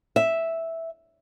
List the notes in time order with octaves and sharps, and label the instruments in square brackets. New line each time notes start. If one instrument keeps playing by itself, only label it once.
[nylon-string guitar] E5